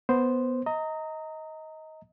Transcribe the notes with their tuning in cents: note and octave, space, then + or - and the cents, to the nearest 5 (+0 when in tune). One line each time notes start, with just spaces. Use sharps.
B3 +0 C5 +0
D#5 +20 A#5 -20